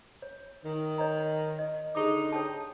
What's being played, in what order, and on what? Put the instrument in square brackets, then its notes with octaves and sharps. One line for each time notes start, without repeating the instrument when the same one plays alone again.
[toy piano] C#5
[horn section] D#3
[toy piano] C#5 D#5 A#5
D#5
[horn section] D3 D#4 [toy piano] G4 G#4 D6
[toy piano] C#5 G5 A5